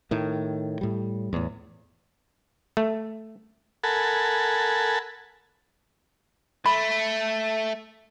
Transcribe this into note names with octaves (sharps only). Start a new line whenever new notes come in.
A2 D#3
A2 G3
E2 A2
A3
A4 A#4 F#5 G#5 A5 B5
A3 B5